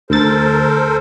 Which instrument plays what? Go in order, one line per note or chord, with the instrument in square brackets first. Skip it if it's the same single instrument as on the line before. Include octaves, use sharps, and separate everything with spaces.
[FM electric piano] D2 A6 [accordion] A4 A#4 C5